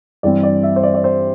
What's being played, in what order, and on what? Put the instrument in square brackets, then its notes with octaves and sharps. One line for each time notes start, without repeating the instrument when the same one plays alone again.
[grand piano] G2 E3 G3 C4 D5
D5
E5
C5
D5
D5
C5